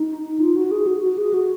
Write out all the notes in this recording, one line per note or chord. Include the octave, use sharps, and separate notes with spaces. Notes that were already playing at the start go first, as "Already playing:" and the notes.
Already playing: D#4
F4
F#4
G#4
F#4
F#4
G#4
F#4